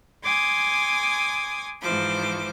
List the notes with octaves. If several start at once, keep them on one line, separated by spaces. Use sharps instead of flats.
G#5 C6 D6 D#6 G#6
G#2 E3 F3 C5 D6